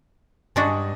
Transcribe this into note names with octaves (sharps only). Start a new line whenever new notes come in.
G2 G#3 D4 F#4 D#5 G#5 A5